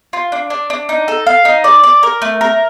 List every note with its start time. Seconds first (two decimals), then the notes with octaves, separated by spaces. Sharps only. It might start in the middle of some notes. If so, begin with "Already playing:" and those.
0.13 F4
0.32 D4
0.50 D4
0.70 D4
0.89 D#4
1.08 A4
1.27 F5
1.45 D#4
1.64 D5
1.83 D5
2.03 A#4
2.22 A3
2.41 A#4